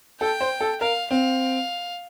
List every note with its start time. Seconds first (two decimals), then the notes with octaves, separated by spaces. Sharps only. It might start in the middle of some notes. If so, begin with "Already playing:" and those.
0.20 A4 G5
0.41 C5
0.60 A4
0.81 A#4 F5
1.11 C4 F5